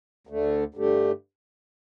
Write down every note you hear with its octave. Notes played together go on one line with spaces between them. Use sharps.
D2 D3 A3
G2 D3 A3 G4